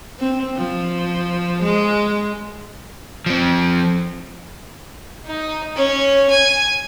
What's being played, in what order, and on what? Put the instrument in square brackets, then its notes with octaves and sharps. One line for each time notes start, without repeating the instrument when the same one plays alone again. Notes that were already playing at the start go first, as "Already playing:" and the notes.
[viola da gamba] C4
F3
G#3
[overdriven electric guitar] F3 C4
[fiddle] D#4
C#4
G#5